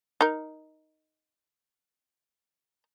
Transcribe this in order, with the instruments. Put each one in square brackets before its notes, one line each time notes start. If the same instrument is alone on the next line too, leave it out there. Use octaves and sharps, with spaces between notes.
[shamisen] D#4 A#4